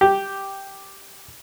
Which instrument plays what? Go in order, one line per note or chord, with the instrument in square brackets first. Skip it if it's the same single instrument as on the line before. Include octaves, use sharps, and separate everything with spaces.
[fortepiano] G4